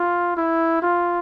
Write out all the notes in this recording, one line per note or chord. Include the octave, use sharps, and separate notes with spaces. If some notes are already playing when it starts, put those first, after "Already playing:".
Already playing: F4
E4
F4